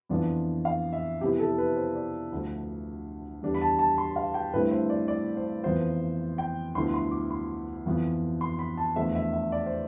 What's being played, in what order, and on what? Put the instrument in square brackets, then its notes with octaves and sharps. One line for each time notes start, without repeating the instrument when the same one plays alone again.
[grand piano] F2 E3 B3 D4 F4
F5
E5
C3 F3 B3 E4 G4
A4
B4
C5
D5
D2 D3 F3
E2 D3 G3 D4
B5
A5
A5
C6
F5
G5
G2 D3 A3 C4 E4 B4
C5
D5
D5
C5
F2 E3 B3 F4 C5
G5
D2 D3 F3 B3 E4 C6
C6
D6
C6
F2 E3 B3 F4
C6
B5
A5
E2 D3 F3 A3 E5
E5
E5
D5
C5